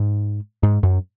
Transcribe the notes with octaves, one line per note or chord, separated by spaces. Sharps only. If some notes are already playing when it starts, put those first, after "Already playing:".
Already playing: G#2
G#2
F#2